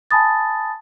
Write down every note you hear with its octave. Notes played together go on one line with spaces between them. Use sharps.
G#5 A5 B5 D#6 A6